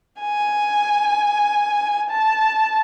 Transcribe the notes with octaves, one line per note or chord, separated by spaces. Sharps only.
G#5
A5